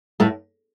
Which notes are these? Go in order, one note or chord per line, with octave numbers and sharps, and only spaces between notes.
A2 A3